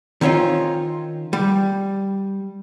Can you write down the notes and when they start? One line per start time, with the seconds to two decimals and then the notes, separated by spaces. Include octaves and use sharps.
0.21 D#3 C4 C#4 D#4 F4
1.33 G3